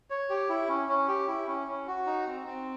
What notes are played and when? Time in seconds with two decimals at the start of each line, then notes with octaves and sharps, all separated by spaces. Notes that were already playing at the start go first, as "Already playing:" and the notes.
0.10 C#5
0.30 G4
0.49 E4
0.68 C#4
0.88 C#4
1.08 G4
1.28 E4
1.47 C#4
1.68 C#4
1.87 F#4
2.06 D#4
2.27 C4
2.46 C4